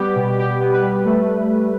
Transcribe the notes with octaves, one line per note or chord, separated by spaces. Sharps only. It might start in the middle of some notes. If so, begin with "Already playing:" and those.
Already playing: G3 B3 G4
B2
B2 G4
B3
B4
G3
A3